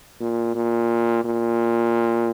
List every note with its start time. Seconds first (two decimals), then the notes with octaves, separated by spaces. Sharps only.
0.20 A#2
0.55 A#2
1.25 A#2